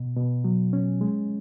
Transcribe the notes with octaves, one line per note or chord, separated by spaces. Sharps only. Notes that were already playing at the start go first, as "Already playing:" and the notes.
Already playing: B2
B2
F#3
C#4
G#3